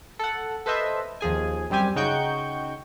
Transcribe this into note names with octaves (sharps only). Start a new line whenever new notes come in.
A4 F#5
A4 B4 C5 D#5 E5
D#2 F3 G#4 G#5
F#2 G3 C4 G4 G#5
C#3 D#4 F#4 G5 C#6 G6